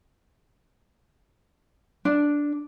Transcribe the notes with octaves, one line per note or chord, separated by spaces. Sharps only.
D4